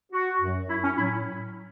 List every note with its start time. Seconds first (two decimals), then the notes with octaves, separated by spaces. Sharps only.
0.12 F#4
0.40 F#2 F#3
0.68 E4
0.83 C#4
0.97 A2 F#3 E4